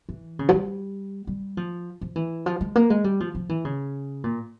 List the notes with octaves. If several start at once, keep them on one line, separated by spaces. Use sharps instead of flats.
E3
C#3
F3
G3
G3
F3
F3
E3
F3
G#3
A#3
G#3
G3
F3
F3
E3
C#3
A#2